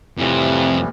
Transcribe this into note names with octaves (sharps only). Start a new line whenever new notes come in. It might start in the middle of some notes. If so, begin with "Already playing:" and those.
F2 A2 C3 E3 G3